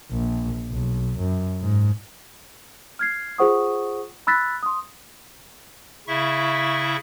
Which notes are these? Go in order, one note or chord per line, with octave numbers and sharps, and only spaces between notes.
A#1
B1
F#2
G#2
F6 G#6 C7
F4 G#4 C5 F#5 C#6 D#6
B5 E6 F#6 A6 B6
C6 D#6
C#3 E4 E5 C#6